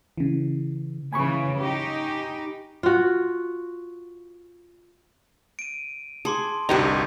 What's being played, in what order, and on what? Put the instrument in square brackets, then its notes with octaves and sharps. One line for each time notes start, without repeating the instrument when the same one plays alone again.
[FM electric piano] C#3 E3
[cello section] C#3 E3 [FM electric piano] G#5 B5 C#6
[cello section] D#4 G4
[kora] F4 F#4
[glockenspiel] D7 D#7
[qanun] G#4 [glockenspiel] A5 C6 D6
[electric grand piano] G1 C2 G2 [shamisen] D#4 G4 [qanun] F#4 C5 A#5